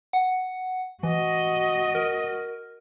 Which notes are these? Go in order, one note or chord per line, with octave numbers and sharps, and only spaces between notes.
F#5
E3 F#4 D#5
A#4